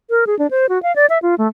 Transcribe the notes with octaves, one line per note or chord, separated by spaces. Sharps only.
A#4
G#4
D4
C5
F#4
F5
D5
E5
F4
A3